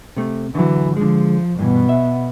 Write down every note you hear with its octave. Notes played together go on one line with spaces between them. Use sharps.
C3 A3
D3 E3 F#3
D3 F3 G#3
G2 B2 E3 B3
E5